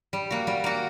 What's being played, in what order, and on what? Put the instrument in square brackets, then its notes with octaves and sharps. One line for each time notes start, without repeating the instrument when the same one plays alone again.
[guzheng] G3
A#3 F#4
G3
A#3 F#4